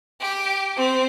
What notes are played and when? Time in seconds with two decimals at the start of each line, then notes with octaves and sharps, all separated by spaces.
0.21 G4
0.75 C4